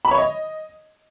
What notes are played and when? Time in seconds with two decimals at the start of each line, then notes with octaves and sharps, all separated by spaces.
0.05 B5
0.11 C#5
0.18 D#5